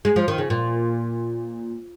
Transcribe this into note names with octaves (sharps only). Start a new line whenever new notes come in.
G#3
F3
D#3
C#3
A#2